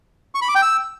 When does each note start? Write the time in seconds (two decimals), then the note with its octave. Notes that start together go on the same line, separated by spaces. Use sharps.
0.35 C#6
0.42 B5
0.48 D6
0.55 G5
0.62 E6